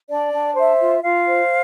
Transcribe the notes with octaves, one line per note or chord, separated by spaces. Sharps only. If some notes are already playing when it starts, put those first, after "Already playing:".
D4 D5
D4
C5 E5
F4
F4 F5
C5